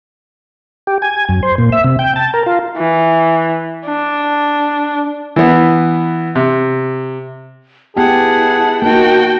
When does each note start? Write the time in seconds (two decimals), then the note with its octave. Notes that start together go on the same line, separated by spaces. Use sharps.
0.87 G4
1.02 G#5
1.29 F#2
1.43 C5
1.58 A#2
1.72 E5
1.84 C3
1.99 G5
2.16 A5
2.34 A#4
2.46 F4
2.77 E3
3.86 D4
5.36 E3 B3
6.35 C3
7.97 B3 E4 G4 G#4 F#5 A5
8.82 A#3 D#4 F#4 G5